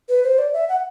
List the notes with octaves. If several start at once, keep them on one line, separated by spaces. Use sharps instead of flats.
B4
C5
D5
E5
F#5